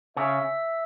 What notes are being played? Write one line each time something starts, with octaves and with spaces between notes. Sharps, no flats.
C#3 E5